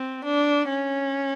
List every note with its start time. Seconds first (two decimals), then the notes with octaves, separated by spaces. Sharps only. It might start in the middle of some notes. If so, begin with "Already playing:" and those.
Already playing: C4
0.24 D4
0.69 C#4